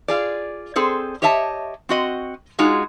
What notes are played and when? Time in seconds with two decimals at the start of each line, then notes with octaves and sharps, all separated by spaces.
0.08 F4 G#4 D5
0.76 C4 G#4 A4 C5
1.22 G4 C#5 D#5 E5 A5
1.89 C4 F#4 D#5
2.59 G#3 D#4 F4 F#4 G#4